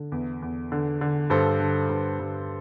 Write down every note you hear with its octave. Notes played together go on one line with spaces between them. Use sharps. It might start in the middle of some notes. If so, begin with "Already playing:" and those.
Already playing: D3
E2
E2
D3
D3
G2 A4 C5
D3
G2
G2